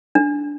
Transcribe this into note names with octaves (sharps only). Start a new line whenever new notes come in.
D4